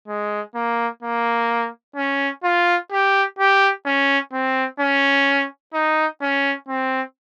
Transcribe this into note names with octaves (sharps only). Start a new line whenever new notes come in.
G#3
A#3
A#3
C#4
F4
G4
G4
C#4
C4
C#4
D#4
C#4
C4